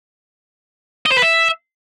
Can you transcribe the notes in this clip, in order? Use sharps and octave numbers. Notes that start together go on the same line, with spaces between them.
D#5
C5
B4
E5